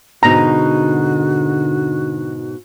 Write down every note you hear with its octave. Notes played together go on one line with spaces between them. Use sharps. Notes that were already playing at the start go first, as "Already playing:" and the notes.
G#2 B2 D3 D#4 F#4 A#5